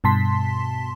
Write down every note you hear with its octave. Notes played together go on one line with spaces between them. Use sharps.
G2 B2 A5 C6 B6